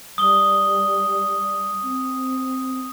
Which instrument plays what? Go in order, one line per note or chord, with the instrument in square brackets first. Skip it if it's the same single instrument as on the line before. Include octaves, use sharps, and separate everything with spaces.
[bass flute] G3 [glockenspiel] D#6 G7
[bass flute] C4